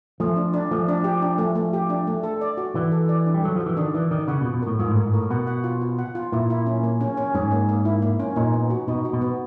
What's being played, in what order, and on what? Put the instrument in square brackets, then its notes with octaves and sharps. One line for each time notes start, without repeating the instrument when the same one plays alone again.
[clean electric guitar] F3 [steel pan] A3
[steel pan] D4
D4
[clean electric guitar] F3 [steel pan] A3
[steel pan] D4
G4
D4
A3
A3
G4
D4
A3
A4
D5
F#4
[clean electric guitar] E3 [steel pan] D5
[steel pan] A4
D5
D4
[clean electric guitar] G3
[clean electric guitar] F#3 [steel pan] A4
[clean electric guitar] F3 [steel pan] F#4
[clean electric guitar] E3
[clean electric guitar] D#3 [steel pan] D4
[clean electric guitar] E3 [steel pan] D5
[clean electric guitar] D#3 [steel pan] D5
[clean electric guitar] C#3 [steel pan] F#5
[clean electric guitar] B2 [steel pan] F4
[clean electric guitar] B2
[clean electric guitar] A2 [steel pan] A#4
[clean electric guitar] G#2 [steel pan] F4
[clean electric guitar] A2
[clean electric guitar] G#2 [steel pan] A#4
[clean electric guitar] A2 [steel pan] A#4
[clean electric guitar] B2 [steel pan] F#5
[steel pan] F#5
F4
F4
F#5
F4
[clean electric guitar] A#2 [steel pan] E4
[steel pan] E4
C#4
A#3
C#4
C#4
[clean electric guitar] G#2 [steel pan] C#4
[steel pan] A#3
A#3
E4
A#3
C#4
[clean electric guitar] A#2 [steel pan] D#4
[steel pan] B3
F#4
[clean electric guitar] B2 [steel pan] D#4
[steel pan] F#4
[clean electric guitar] B2
[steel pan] B3